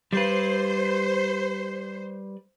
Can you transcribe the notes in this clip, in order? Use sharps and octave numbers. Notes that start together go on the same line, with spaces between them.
G3 B4 C5